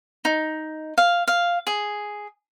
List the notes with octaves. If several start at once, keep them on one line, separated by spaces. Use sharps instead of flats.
D#4
F5
F5
G#4